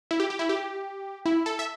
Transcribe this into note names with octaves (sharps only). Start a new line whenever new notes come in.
E4
G4
G4
E4
G4
E4
A4
E5